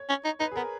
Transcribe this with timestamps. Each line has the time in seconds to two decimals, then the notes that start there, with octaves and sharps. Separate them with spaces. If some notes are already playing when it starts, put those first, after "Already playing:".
Already playing: C#5
0.09 C#4
0.25 D#4
0.40 D#4 B4
0.52 G#4
0.56 B3 A#4